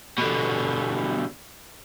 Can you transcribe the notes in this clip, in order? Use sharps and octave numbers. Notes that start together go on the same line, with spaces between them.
B2 D3